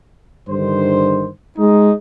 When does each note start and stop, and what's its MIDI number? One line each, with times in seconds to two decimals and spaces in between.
0.48 1.29 43
0.48 1.29 50
0.48 1.29 51
0.48 1.29 72
1.58 1.93 56
1.58 1.93 63